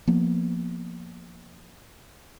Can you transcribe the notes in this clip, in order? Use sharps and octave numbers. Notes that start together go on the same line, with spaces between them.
F3 A#3 B3